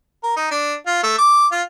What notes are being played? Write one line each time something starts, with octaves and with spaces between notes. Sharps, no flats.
A#4
D#4
D4
F4
A3
D6
F4